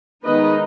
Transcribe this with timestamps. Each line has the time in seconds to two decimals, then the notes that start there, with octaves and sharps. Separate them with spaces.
0.23 D#3 G#3 B3 D#4 B4 D#5